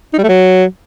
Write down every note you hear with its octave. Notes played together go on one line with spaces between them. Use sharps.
D#4
G3
A3
F#3